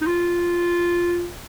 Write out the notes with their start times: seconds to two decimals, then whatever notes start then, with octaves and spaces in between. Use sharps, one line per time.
0.01 D#4
0.06 F4